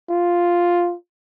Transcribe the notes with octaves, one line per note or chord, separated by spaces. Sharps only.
F4